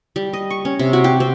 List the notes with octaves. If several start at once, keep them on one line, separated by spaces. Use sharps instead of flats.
G3
D#5
C#6
C#4
C3
F#4
G4
C4